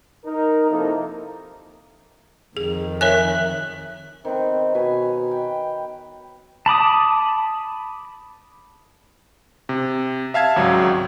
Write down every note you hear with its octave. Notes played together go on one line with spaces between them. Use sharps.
D#4 A#4
C3 F3 A#3 D#4 E4 A4
F2 D#3 G#4
A#4 C#5 E5 G#5 F#6
D#3 B3 C4
B2 B4 C#5 G#5
G5
A5 B5 D6 D#6
C3
E5 F5 A5 G#6
G#1 C#2 F#3